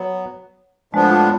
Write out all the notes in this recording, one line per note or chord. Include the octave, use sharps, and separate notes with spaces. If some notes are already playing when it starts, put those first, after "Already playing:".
Already playing: F#3 B3
A2 F3 G#3 B3 D4
F4